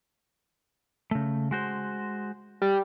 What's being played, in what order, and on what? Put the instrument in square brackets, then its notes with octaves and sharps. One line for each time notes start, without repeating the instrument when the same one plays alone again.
[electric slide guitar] C#3 A3
G#3 F#4 C5
[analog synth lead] G3